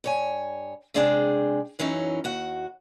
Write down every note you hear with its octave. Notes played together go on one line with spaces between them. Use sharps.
G2 C#5 G#5
C3 G#3 D4 G#4 D#5 G5
F#2 E3 F#3 C#4 D#4
D#2 F#4 F#5